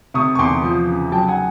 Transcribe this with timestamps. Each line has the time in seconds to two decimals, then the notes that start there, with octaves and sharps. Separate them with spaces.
0.14 C3 C#6 D#6
0.35 C#6
0.39 E2 C6 D6
0.63 F3
0.87 C#3
1.12 F#3 G5 A5
1.28 F#5 G#5